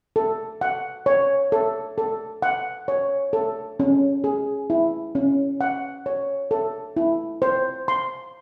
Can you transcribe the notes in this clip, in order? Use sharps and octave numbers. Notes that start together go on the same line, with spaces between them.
A4
F#5
C#5
A4
A4
F#5
C#5
A4
C#4
G#4
E4
C#4
F#5
C#5
A4
E4
C5
C6